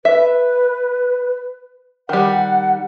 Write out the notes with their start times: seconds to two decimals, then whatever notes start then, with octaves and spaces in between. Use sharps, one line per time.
0.05 B4 E5
2.09 D#3 G3 F#5